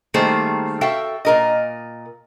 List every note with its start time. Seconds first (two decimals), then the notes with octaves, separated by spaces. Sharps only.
0.14 D#3 G3 A3 A#3 G#4 C5
0.81 F#4 A4 E5 F5 G5
1.25 A#2 A#4 D#5